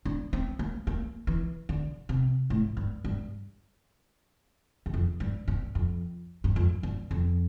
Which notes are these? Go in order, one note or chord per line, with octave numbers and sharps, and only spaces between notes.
D4
C4
A#3
A#3
E3
D3
C3
A2
G2
G2
E2
F2
G2
G2
F2
G2
F2
G2
F2